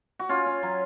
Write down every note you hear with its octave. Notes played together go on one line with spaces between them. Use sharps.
F#4
C#4 F4
C#4
F#3